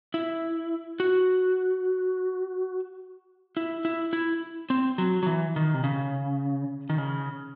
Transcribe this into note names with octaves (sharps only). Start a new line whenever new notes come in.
E4
F#4
E4
E4
E4
C4
F#3
F#3
E3
D#3
C3
C#3
D#3
C#3